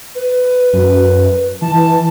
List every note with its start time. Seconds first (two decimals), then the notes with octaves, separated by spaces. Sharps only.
0.15 B4
0.73 F#2
1.62 E3 A5